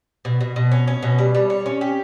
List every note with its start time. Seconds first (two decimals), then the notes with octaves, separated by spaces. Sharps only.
0.25 B2
0.41 B2
0.56 B2
0.72 C#4
0.88 C#4
1.03 B2
1.19 G3
1.35 G3
1.50 C#5
1.66 C#4
1.81 G4